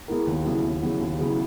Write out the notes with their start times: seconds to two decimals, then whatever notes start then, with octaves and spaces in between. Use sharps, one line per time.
0.08 G#3 B3 E4 A#4
0.27 D#2
0.45 C#3 F#3 B3 E4
0.63 D#2
0.82 C#3 F#3 B3 E4
1.01 D#2
1.18 C#3 F#3 B3 E4